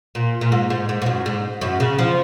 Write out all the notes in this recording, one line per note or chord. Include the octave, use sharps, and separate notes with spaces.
A#2
A#2
G#2
G#2
G#2
G#2
F#2
G#2
F#2
C#3
F3